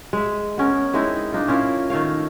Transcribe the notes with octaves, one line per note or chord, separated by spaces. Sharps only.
G#3 E5
B3 C#4 A#4
G#3 C4 D#4 E4
D4 D#4 F4
C#4 E4 F4 A#4
D#3 A3 C#5 F5